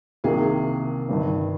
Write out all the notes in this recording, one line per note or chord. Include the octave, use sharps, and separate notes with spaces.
C2 C3 D#3 A#3 G#4
G1 G2 D#3